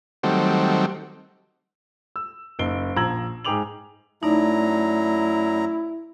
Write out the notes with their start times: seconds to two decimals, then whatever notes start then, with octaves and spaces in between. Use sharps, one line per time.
0.23 D#3 F#3 G3 A3 C4
2.16 E6
2.59 F#1 D#4 C7 D7 G7
2.96 A#1 F3 A#5 E6 G#6 F#7
3.45 G#2 G#4 G5 D6 F7 F#7
4.23 F#2 F#3 A3 D#4 E4 D5 A#5